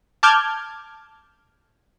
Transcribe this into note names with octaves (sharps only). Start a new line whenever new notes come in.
A5 D6 F6 G6 G#6